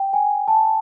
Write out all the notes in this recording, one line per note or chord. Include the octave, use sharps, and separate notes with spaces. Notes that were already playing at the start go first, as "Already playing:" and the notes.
Already playing: G5
G#5
A5